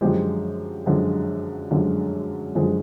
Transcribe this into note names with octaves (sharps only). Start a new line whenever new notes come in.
F#2 D3 F3 G#3 G4
F#2 D3 F3 G#3
F#2 D3 F3 G#3
F#2 D3 F3 G#3 G#4